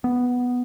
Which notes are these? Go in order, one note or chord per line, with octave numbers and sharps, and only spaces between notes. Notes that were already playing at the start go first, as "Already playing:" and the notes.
B3